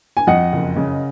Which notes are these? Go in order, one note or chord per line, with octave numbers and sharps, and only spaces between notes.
G#5
F2 D#5 F#5
F#1
C#3